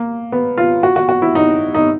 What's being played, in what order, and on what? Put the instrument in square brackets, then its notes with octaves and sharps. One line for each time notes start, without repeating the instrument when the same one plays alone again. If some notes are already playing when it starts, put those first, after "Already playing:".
Already playing: [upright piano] A#3
B3
F4
F#4
F#4
F#4
E4
D#4
D#4